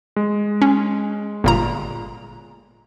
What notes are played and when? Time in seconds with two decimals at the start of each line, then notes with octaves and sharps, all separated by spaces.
0.16 G#3
0.61 C#4
1.44 G1 A#2 A#5